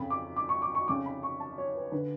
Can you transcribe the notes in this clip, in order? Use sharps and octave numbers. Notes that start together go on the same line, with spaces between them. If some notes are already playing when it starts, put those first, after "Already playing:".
Already playing: F2 C#3 B5
D6
D6
C#6
D6
C#6
F2 C#3 D6
B5
C#6
A5
C#5
B4
D3 B4